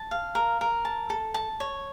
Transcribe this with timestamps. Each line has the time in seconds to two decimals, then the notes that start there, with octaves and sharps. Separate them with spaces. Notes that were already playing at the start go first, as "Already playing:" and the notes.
Already playing: A5
0.11 F5
0.35 A#4
0.61 A#4
0.85 A5
1.10 A4
1.34 A5
1.60 C#5